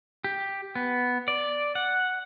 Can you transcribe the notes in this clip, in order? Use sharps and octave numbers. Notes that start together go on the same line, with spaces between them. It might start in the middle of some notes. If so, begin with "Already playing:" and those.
G4
B3
D5
F#5